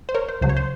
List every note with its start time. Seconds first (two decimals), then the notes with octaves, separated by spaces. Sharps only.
0.09 C5
0.14 A#4 C#5
0.29 C5
0.41 C#2 C#3 F#3 C5
0.49 C#5
0.57 C5